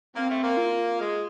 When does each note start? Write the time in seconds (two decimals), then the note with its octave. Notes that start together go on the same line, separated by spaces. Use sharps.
0.15 A#3 C4
0.29 A3
0.42 A#3
0.57 F4
1.00 G#3